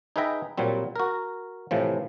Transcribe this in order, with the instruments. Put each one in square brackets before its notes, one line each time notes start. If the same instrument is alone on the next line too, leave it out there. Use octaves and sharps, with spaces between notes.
[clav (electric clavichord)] D#4 G#4 B4 E5 G5 A#5
A#2 F#3 G3 C4
F#4 A#4
A2 C3 E3 F3